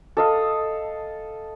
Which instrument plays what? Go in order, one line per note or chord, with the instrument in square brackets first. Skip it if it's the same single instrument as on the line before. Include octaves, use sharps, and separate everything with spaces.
[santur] A4 D#5 F5